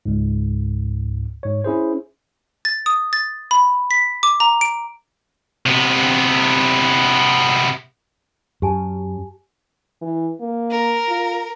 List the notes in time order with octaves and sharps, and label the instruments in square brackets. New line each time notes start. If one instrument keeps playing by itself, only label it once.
[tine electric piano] C#2 G#2
G#2 C#5
C#4 E4 G#4 C5
[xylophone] A6
D#6
A6
B5
B6
D6
A#5
D7
[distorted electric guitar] C3 B3
[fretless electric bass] F#2 [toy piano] G4 G#5 A5
[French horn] E3
A#3
[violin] A#4
[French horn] F4